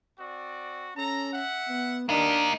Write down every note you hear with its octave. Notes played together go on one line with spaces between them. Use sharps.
C4 F#4 D5
C#4 A4 A#5
E5 F#5
B3
G3 A#3 B3 D4 D#4 A#4